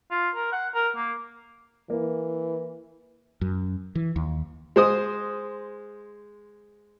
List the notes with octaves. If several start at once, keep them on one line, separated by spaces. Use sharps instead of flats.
F4
A#4
F#5
A#4
A#3
E3 A#3
F#2
E3
D#2
G#3 C5 D#6